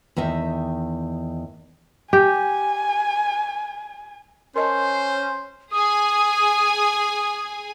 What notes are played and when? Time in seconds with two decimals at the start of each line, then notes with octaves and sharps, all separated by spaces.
0.16 E2 D#3 D#5 E5
2.13 G4 G#5
4.56 C#4 A#4 C5 D#5 A5 C6
5.72 G#4 G#5 D#6